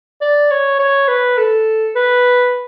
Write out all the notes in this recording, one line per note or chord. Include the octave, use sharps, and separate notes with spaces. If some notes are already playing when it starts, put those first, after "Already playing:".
D5
C#5
C#5
B4
A4
B4